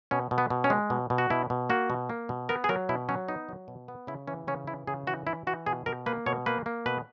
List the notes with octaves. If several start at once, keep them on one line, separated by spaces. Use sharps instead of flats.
B2 C#4
B2
B3
B2
C#4
G#3
B2
B2
F#4
B2 E4
B2
A#3 F#4
B2
A#3
B2
B3 A#4
G#4
F#3 A#4
B2 E4
F#3 C#4
B3 D#4
F#3
B2
B3
C#3 E4
E3 C#4
C#3 C#4
E3 E4
C#3 G#4
E3 F#4
E3 E4
E3 F#4
B2 G#4
B2 A#4
A#3 B4
B2 C#5
A#3 B4
A#3
B2 B4